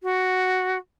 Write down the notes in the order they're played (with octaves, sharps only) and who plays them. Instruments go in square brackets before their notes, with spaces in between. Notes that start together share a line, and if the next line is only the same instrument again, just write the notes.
[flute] F#4